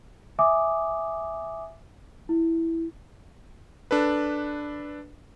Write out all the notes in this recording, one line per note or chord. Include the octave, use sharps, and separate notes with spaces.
E5 G#5 D6 D#6
E4
D4 A4 B4